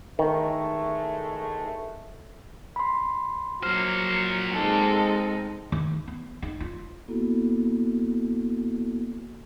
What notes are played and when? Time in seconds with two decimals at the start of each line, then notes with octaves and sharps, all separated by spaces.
0.19 A1 D#3 G#3 A3
2.76 B5 C6
3.63 F#3 A#3 C5 F6
4.54 G#3 C4 D#4 A4
5.72 D#3
6.08 B3
6.42 D#4
6.60 F4
7.08 A#3 B3 E4 F#4 A4